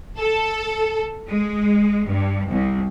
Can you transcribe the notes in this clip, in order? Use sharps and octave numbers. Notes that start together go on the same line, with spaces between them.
A4
G#3
G2
C2